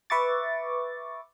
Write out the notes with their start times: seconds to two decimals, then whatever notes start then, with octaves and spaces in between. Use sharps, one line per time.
0.10 B4 E5 C#6 D6 A6